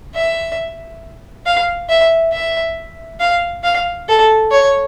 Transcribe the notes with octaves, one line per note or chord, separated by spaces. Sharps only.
E5
F5
E5
E5
F5
F5
A4
C#5